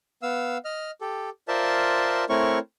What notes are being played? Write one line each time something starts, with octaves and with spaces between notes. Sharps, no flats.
B3 F5 E6
D#5 F6
G4 A4
F4 A#4 C5 D5 E5 A5
A3 C4 E4 A#4 C#5 C#6